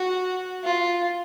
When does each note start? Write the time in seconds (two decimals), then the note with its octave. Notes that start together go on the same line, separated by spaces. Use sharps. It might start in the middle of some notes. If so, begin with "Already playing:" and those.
Already playing: F#4
0.64 F4